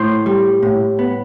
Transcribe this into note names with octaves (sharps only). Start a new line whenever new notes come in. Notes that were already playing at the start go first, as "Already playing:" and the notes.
Already playing: A2 C5
G3
A2
B3